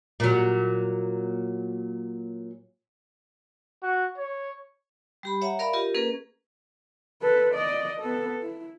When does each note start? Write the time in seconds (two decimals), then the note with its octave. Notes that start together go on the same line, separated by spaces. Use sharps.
0.20 A#2 F#3
3.82 F#4
4.18 C#5
5.23 G3 G4 B5
5.41 C#5 E5 F#5 A#5
5.59 A#4 D5 E5 F5 B5
5.73 F4 G4 A#4 D#5
5.94 A#3 C#4 G#4 A#4 B4
7.22 A4 B4
7.55 D5 D#5
8.00 B3 A4
8.42 E4